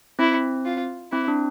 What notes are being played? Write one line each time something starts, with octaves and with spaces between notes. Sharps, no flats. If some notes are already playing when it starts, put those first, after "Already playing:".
C4 E4
F4
C4 E4
D4